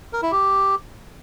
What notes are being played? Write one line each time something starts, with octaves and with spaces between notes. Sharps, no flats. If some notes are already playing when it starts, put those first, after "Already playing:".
A#4
E4
G4